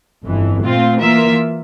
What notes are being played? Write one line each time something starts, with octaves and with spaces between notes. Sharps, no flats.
G1 F2 E3
A#2 A3 C4 F4
E3 A#3 F4 A#4 E5